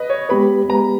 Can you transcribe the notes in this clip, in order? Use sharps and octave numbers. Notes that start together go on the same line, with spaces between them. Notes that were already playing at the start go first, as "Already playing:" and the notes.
Already playing: B4 D#5
C#5
G#3 B3 G4 B4 B5
G#3 B3 G4 B4 A#5